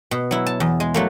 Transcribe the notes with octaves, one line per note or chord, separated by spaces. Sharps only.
B2
F#3 E4
A5
E2
G#3
F#3 A3 A#3